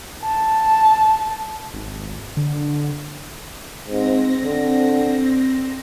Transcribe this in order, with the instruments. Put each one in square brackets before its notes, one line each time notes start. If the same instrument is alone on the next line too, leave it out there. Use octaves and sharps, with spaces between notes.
[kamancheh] A5
[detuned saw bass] G#1
D3
[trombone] G#2 [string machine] C4 A#6
[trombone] D3